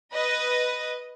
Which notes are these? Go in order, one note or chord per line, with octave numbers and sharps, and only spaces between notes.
B4 D#5